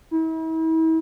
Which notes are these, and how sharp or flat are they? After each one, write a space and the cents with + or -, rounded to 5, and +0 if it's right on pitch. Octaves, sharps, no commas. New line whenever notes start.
E4 -40